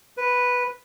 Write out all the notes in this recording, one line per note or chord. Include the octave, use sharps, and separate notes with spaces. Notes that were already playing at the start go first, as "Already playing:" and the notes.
B4